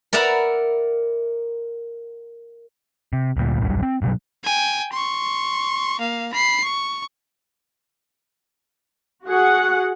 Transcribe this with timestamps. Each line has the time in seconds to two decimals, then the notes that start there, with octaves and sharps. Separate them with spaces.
0.13 A#4 D5 E5 F#5 A#5 B5
3.13 C3
3.37 D2 A#2
3.61 D1 A#1 F#2 G3
3.83 C4
4.02 G2 B2 F#3
4.44 G5 G#5
4.93 C6 C#6
5.99 A#3 F5
6.33 B5 C7
6.64 C#6
9.26 F#4 G#4 F#5